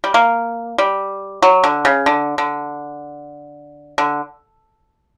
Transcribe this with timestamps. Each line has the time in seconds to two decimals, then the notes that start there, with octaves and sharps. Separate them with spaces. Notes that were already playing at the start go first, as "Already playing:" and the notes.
0.04 G3
0.14 A#3
0.78 G3
1.42 F#3
1.64 D3
1.85 C#3
2.06 D3
2.38 D3
3.98 D3